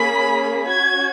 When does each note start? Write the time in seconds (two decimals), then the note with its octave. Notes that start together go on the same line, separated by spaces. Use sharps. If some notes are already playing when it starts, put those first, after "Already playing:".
Already playing: A#3 C#4 G#4 B5
0.67 C#4 F#4 G#6